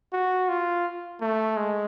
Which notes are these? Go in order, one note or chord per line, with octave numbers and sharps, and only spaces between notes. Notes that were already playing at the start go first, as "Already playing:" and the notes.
F#4
F4
A3
G#3